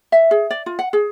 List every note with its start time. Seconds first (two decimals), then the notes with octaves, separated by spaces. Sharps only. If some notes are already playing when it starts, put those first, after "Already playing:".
0.12 E5
0.31 G#4
0.50 D5
0.66 F4
0.79 F#5
0.93 G#4